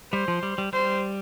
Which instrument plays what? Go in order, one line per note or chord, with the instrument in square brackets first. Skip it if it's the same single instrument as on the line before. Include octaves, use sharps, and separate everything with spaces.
[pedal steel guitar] G3 [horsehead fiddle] C5
[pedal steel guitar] F3
G3
G3
[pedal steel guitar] G3 [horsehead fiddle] C5